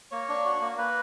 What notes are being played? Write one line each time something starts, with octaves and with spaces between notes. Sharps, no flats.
A#3 C#5
D4
F#4
A#3
A#3 B4